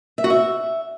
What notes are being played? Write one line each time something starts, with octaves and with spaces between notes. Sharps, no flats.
E5
F#4
E5